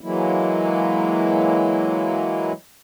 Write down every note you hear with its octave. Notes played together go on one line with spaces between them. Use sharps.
E3 F#3 G#3 A#3 E4